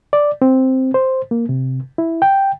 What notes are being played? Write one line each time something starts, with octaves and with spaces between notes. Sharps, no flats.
D5
C4
C5
A#3
C3
E4
G5